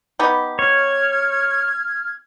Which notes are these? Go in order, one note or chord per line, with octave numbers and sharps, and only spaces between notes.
B3 D#4 G4
C#5 F6 G#6